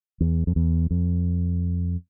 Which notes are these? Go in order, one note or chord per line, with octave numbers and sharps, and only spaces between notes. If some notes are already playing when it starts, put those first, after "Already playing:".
E2
F2
E2
F2